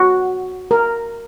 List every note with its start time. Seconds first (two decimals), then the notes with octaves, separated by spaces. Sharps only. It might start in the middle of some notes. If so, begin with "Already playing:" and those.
Already playing: F#4
0.71 A#4